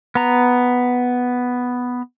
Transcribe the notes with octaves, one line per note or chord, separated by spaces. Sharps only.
B3 A#5